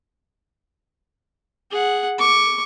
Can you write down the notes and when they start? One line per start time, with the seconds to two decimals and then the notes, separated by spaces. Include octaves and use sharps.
1.71 G#4 F#5
2.18 C#6 D6